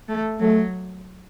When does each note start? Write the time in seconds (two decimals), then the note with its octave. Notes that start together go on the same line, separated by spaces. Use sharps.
0.08 A3
0.40 F#3 A3